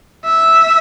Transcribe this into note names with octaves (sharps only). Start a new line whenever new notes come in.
E5